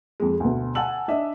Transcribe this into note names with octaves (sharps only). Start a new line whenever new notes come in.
F2 G#3
D2 B2
F#5 G#5 A5 E6 F#7
D4 D#5 E5